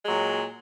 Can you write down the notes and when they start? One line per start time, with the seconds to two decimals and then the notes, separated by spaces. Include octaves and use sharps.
0.03 G#3
0.06 F#3
0.09 A#2